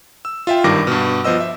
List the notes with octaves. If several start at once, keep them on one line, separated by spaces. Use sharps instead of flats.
E6
F4 E5 G5
G#1 G2 D#3 G3 D6 A#6
G2 B2
F3 B3 C5 D#5 E6
E5